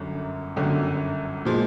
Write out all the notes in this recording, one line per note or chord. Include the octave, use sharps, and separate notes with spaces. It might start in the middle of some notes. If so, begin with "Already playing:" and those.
Already playing: G1 F#2 D3
G1 F#2 D3
A#2 F3 G#3